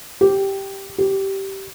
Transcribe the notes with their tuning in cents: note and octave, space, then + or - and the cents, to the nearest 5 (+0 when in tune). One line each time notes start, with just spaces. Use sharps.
G4 -5
G4 -15